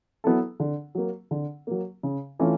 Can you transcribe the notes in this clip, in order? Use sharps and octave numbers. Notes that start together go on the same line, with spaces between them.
F#3 B3 E4 A4
D3
F#3 A#3
D3
F#3 A#3
C#3
E3 A3 C#4 F4